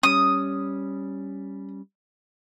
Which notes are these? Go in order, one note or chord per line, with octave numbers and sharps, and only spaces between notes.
G3 C#4 D#6